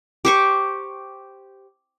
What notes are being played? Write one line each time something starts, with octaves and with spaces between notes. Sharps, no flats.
G4 C5 C#6